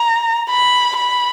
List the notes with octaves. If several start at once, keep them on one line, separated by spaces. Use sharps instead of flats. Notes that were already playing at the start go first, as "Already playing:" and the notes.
Already playing: A#5
B5
B5